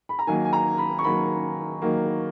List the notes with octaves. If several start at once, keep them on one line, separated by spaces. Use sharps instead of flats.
B5
A#5
D#3 F#3 A#3 G#5
G#5
A#5
B5
C#6
D#3 F#3 A#3 B5
D#3 F#3 A#3